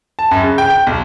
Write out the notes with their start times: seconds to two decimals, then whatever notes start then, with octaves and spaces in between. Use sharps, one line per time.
0.19 A5
0.31 F#2
0.43 C#3
0.58 G5
0.70 G5
0.87 B1